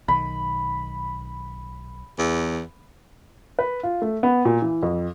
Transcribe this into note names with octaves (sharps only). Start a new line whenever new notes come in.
B1 D#3 B5
E2
B4
F4
A3
B3
A#2
E3
F2